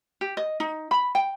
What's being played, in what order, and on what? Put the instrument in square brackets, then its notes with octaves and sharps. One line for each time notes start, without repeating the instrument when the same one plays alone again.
[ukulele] G4
D#5
D#4
B5
G5